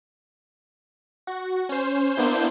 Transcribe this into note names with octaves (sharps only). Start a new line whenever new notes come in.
F#4
C#4 C5
A#3 B3 D4 E4 C5 G6